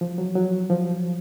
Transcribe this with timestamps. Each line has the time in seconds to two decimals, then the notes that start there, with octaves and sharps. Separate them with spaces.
0.01 F3
0.18 F#3
0.36 F#3
0.70 F3